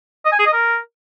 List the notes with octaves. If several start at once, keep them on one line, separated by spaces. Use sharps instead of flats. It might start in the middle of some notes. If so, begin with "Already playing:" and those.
D#5
G#5
G#4
D#5
A#4